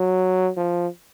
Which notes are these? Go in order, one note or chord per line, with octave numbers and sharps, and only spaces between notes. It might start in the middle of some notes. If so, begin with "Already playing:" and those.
Already playing: F#3
F3